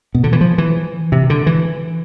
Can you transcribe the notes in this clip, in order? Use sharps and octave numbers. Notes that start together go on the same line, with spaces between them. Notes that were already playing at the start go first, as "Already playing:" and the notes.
B2
D3
E3
F3
E3
C3
D3
E3